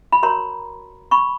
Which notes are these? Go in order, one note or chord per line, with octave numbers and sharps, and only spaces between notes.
B5
F#4 A#4 C#5 A#5 C6
B5 C#6